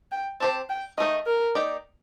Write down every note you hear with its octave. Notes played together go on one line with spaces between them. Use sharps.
G5
C4 G4 C5 A5
G5
D#3 A3 D#4 D#5
A#4
A#3 D#4 G4 D5